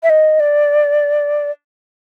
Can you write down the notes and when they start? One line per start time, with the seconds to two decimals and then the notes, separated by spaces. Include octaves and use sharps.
0.03 E5
0.10 D#5
0.40 D5